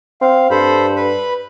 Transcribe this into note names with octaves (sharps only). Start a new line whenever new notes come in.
C4 F5
G2 A4 C5 B5
B4 B5